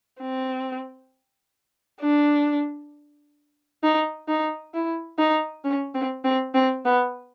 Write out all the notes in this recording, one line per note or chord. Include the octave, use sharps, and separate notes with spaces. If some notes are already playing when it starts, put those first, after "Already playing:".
C4
D4
D#4
D#4
E4
D#4
C#4
C4
C4
C4
B3